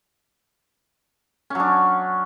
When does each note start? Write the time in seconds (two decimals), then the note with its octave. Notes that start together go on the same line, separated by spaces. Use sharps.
1.50 C#4
1.55 F#3
1.60 D4